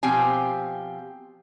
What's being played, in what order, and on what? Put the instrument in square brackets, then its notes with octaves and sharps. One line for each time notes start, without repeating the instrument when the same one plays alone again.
[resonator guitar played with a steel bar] B2 F3 C4 G4 G#5